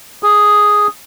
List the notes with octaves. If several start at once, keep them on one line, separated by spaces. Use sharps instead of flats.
G#4